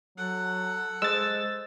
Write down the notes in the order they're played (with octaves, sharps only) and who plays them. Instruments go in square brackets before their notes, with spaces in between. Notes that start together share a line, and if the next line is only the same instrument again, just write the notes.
[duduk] F#3 [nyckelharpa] A4 F#5
[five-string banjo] G#3 [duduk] C5 [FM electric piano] E6 A6